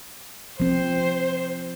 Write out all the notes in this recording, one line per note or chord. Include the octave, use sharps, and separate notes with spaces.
F3 C4 C5